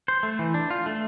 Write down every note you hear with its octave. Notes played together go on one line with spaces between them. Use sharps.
C5
A3
E3
D4
F4
A3